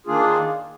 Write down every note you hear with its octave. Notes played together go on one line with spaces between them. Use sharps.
D#3 A#3 D4 F4 G#4